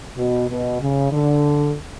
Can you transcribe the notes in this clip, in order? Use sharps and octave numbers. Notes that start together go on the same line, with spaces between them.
B2
B2
C#3
D3